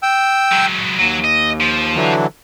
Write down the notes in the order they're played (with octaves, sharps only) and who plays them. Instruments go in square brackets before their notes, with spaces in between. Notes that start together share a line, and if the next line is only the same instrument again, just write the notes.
[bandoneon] G5 E6
[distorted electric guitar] F#3 G#3
[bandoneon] D#2 [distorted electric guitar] F#3
[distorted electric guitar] D#5
F3
[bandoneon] D3 E3 F#3